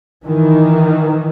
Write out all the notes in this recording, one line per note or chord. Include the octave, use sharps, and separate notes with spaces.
D#3 E3